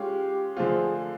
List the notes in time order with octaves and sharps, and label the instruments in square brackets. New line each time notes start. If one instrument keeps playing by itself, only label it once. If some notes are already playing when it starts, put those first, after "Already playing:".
Already playing: [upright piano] G#3 C#4 F4 [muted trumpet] G4
[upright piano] D3 F3 A3 C4 F4 [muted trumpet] G#4